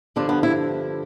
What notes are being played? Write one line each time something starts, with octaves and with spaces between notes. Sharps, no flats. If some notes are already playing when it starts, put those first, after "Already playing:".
G2 D3 F3 D4
B3
E4